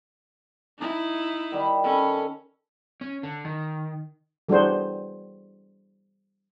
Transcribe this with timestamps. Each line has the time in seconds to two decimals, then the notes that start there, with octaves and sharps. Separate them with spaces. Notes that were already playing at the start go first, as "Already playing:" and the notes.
0.79 D#4 E4
1.52 D#3 G3
1.84 C#4 A4 A5 B5
3.01 C#4
3.23 D3
3.45 D#3
4.49 E3 G3 D4 F#4 G#4 C5